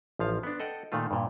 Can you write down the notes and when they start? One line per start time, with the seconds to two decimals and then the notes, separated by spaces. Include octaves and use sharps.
0.19 A1 F3 F5
0.43 B3 D4
0.60 A4 D#5 F#5 G5
0.92 A#2 D#3 A3 F4
1.11 G2 A#2